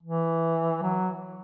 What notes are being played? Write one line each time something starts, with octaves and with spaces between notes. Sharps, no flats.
E3
F#3